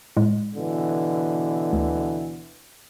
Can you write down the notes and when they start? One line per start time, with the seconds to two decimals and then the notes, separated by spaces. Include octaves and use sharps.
0.17 A2 G#3
0.55 B2 D3 E3
1.73 D2